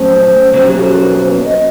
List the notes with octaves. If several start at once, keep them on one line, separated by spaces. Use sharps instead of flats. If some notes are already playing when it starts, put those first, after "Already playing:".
Already playing: A#2 F#3 A3 C#4 C5
B2 F#3 A#3 C#4 F#4 C5
G4
A4
A#4
B4
C5
B4
D#5